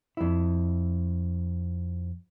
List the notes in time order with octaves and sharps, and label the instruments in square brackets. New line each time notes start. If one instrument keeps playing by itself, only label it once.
[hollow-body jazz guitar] F2 E4